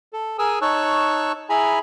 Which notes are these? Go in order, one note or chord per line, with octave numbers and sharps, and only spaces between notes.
A4
G#4 A#4 G#5 D#6 E6
D#4 C#5 A5 C#6 E6 F#6
E4 G#4 G#5 A#5 B5